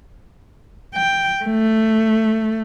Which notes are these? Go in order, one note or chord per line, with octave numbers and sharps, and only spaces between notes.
G5
A3